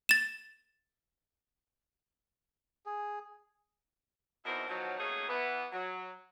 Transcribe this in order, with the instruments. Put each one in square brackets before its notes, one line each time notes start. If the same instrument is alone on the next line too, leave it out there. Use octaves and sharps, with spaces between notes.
[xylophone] A6 E7
[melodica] G#4
[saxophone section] E2 B2 C4 D#4 E4 A#4
B2 D#3 F3 F#3
F#3 A3 A#3 C#4 D#4 G#4
E3 B3
F#3